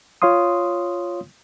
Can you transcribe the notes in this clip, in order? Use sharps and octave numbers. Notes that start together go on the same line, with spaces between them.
F4 C#5 F5 C6 D#6